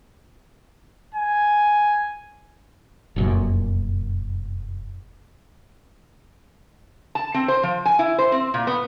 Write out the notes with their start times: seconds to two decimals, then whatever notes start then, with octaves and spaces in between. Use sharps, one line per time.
1.14 G#5
3.16 F1 F#2 A#2
7.15 A5
7.34 C4
7.48 C5
7.63 F3
7.85 G#5
7.99 E4
8.18 C5
8.32 C4
8.54 A#2
8.67 B3